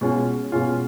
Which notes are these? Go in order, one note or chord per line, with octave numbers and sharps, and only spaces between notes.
B2 G#3 C#4 F4
B2 G#3 C#4 F4